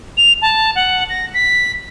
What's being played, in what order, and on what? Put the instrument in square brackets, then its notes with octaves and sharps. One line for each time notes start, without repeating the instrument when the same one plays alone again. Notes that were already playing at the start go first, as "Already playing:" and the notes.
[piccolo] F7
A5
F#5
A#6
B6